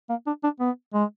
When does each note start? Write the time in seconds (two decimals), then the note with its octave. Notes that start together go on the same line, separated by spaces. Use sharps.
0.09 A#3
0.26 D4
0.43 D4
0.60 B3
0.94 G#3